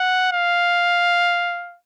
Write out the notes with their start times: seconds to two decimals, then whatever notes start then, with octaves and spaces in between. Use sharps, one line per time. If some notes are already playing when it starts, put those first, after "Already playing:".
Already playing: F#5
0.32 F5